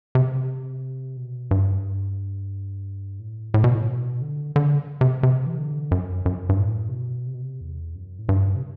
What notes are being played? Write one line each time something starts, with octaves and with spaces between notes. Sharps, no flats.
C3
B2
G2
A2
A2
B2
A2
B2
D3
D3
C3
C3
E3
D3
F#2
F#2
G2
A2
C3
B2
C3
B2
C3
E2
F#2
A2
G2
C3